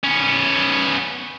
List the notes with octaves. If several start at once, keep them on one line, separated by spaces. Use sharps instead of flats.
B3 C#4